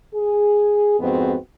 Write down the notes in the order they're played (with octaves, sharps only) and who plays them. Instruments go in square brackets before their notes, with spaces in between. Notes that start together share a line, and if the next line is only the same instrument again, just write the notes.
[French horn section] G#4
F2 G#2 B3 C4 F#4 G#4